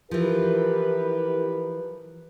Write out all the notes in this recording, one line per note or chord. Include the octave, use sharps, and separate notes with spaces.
E3 F3 E4 G4 A#4 B4